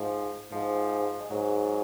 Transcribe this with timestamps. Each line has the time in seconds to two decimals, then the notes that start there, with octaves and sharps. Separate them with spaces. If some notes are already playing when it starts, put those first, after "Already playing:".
Already playing: G#2 F3
0.52 G#2 F3
1.20 G#3
1.31 G#2 F#3